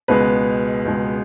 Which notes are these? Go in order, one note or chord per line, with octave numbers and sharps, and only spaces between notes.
C#2 B2 G#3 B4
C#2 B2 G#3